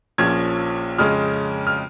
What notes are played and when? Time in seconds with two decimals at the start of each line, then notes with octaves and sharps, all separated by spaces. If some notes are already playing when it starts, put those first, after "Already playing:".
0.18 A#1 A#2 F3 C#4 G#6
0.98 F2 C#3 G#3 C#4 F6
1.67 F6